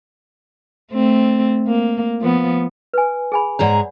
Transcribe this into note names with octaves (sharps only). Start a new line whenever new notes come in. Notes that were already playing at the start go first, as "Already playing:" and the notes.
A3 C4
A#3
F3 B3
B4 G#5
G#4 G#5 B5
G#2 G#4 C#5 D5 F#5 A#5